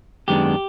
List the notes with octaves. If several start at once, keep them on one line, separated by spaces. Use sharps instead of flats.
F#2 D#3 G#3 B3 D4 G4